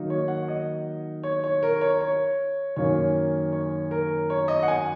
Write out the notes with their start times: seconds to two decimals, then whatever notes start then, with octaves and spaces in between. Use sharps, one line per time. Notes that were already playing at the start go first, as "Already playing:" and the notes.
Already playing: D#3 F#3 A#3 D#4
0.10 C#5
0.28 F#5
0.48 D#5
1.23 C#5
1.44 C#5
1.63 A#4
1.81 C#5
2.01 C#5
2.76 F#2 D#3 A#3 C#4 C#5
3.53 C#5
3.91 A#4
4.30 C#5
4.48 D#5
4.63 F#5
4.68 G#5